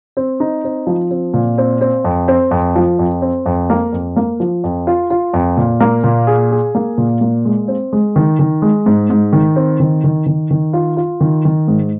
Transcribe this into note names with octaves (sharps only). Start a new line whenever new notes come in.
C4
D#4
C4
F3
C4
A#2
C4
C4
F2
C4
F2
F3
F2
C4
F2
A#3
F2
A#3
F3
F2
F4
F4
F2
A#2
A#3
A#2
G#4
G#4
A#3
A#2
A#3
G#3
C4
G#3
D#3
D#3
G#3
G#2
G#2
D#3
C4
D#3
D#3
D#3
D#3
F4
F4
D#3
D#3
G#2